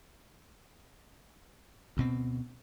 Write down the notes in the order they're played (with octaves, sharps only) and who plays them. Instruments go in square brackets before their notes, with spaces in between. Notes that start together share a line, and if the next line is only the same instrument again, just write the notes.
[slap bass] D2 B2 C4